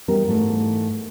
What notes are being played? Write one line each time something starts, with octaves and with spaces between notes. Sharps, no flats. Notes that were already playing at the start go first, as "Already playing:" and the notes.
E3 G3 B3 C#4 A#4
G#2 E3 A3